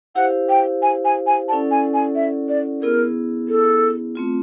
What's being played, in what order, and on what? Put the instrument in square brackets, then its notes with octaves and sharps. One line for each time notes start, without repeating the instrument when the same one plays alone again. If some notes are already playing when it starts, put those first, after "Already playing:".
[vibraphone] E4 G4 C5 F5 [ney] F#5
[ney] G5
G#5
G#5
G#5
[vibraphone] C#4 E4 A4 D5 F#5 [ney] A5
[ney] G#5
G#5
E5
D5
[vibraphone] B3 E4 G#4 [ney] A#4
[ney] A4
[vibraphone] A3 C4 F4